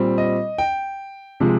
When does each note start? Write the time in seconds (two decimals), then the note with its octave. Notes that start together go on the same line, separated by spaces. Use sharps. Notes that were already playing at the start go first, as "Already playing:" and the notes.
Already playing: A#2 G3 C4
0.18 D#5
0.58 G5
1.40 C3 F3 G#3